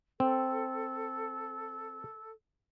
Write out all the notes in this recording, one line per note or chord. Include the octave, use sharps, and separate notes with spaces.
C4 A4